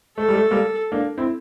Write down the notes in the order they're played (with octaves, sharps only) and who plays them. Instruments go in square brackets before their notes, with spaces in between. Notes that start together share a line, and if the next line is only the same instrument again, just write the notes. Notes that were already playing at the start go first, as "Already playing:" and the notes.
[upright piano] A3 [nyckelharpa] A4
[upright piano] G3
A3
G3 A#3
A#3 D4
C4 E4